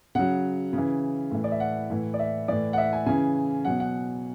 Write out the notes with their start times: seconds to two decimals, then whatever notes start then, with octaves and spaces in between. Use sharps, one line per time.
0.15 C#3 F#3 F#5
0.73 C#3 E3
1.31 A2 E3
1.44 D5
1.52 E5
1.60 F#5
1.90 A2 E3
2.14 D5
2.19 E5
2.48 A2 E3 D5
2.73 F#5
2.78 E5
2.93 G#5
3.06 C#3 E3 G#5
3.65 B2 F#3 F#5
3.80 F#5